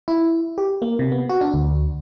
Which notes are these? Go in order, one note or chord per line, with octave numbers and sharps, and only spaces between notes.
E4
G4
A#3
C3
B3
F#4
D4
D2